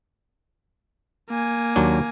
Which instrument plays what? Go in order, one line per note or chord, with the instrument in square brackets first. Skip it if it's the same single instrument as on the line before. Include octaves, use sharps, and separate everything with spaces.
[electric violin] A#3 G#5
[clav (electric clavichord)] D#2 F#3 D4